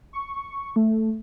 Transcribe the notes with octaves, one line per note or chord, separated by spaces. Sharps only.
C#6
A3